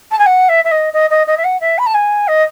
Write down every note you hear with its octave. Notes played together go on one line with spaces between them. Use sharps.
A5
G#5
F#5
E5
E5
D#5
D#5
D#5
D#5
E5
F#5
E5
B5
A5
G#5
D#5